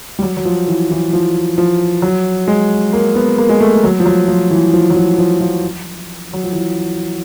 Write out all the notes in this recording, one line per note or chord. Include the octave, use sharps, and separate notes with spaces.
G3
F#3
F#3
F3
E3
E3
F3
F3
F#3
G#3
A#3
B3
A#3
G#3
A3
F#3
F3
F#3
F3
E3
F3
F#3
F3
F3
F3
F#3
F3
E3